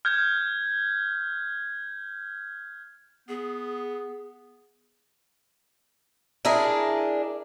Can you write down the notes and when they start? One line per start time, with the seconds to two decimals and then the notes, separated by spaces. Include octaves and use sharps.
0.05 F6 G6 G#6
3.29 B3 G#4
6.45 D4 E4 G#4 A#4